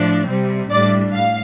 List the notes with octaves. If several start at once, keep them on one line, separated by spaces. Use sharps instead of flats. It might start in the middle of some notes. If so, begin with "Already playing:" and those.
Already playing: A2 F3 D4
C3 G3 C4
A2 G3 D4 D5
A2 F5